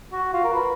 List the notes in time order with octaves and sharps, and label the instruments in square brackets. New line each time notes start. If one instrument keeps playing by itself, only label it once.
[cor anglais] F#4
F4
A#4
B4